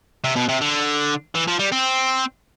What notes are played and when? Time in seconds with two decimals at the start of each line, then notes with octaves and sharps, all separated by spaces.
0.24 C3
0.36 B2
0.49 C3
0.61 D3
1.35 E3
1.47 F3
1.59 G3
1.72 C4